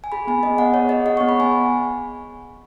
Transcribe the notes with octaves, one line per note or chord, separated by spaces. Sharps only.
G#5
G#4 B5
B3 G#5
G#4 D#5
B3 F#5
G#4 C#5
G#4 D#5
G#4 F#5
C#6
B3
B5
B3 G#5